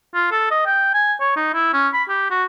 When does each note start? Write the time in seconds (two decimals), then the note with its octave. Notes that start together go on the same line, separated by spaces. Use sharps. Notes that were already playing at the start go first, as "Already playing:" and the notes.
0.15 F4
0.31 A4
0.51 D#5
0.66 G5
0.94 G#5
1.21 C#5
1.36 D#4
1.54 E4
1.73 C#4
1.94 B5
2.09 G4
2.31 F#4